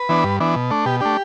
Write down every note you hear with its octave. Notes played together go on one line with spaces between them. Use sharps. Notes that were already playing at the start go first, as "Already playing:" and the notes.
Already playing: B4
E3 B3 D4
G2
E3 B3 D4
B2
A3 D4
B2 G4
A3 D4 G4